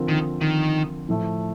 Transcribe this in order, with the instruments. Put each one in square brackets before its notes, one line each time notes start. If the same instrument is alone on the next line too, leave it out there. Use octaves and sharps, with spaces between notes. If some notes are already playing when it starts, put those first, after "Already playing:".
Already playing: [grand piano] D3 F3 C4 F4 A#4
[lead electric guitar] D#3
D#3
[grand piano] A2 F3 A3